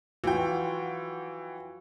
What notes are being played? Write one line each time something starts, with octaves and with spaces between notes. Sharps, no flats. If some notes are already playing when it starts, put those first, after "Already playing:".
E3 F4 F#4 G5